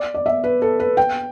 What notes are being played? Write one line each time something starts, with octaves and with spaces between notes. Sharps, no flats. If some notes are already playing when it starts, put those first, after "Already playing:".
Already playing: D5
D5
E5
B4
A4
B4
G5